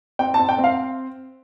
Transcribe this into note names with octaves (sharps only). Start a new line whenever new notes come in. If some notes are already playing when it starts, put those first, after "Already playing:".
C4 G5
A5
C4
G5
C4
F5